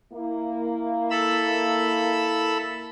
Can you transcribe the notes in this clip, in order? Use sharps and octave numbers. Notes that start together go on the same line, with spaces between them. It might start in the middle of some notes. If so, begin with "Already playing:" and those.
A#3 E4
A4 B5 E6